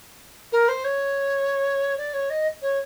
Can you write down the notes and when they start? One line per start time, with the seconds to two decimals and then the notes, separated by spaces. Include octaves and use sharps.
0.52 A#4
0.68 C5
0.84 C#5
1.97 D5
2.14 C#5
2.30 D#5
2.62 C#5